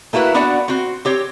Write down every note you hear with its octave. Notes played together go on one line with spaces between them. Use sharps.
A3 A#3 E4 F#4 B4
B3 D4 F#4 D5 F#5
C4 F#4
C4 G4 C#5